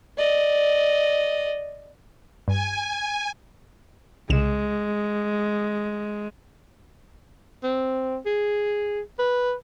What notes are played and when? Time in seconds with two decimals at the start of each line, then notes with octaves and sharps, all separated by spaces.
0.18 D5 D#5
2.48 G2 G#5
4.30 C2 C#3 G#3 E7
7.63 C4
8.26 G#4
9.19 B4